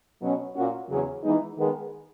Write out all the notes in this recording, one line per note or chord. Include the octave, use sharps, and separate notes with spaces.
B2 F#3 C#4
A#2 A#3 C#4 F#4
E2 C#3 F#3 C#4 G#4
E3 G#3 B3 D#4
D#3 G#3 B3